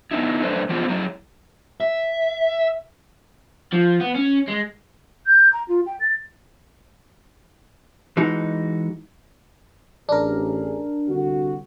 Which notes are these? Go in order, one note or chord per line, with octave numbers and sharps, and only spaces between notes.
B3 D#4 E4
F#2 A3 D4 B4 C5
E3 A#3 B3 F4 G#4 C5
F#3 E4 G#4
E5
F3
B3
C#4
G#3
G6
A#5
F4
G5
A6
E3 G#3 D#4 F#4
A1 D4 G#4 A#4
C2 D3 F#4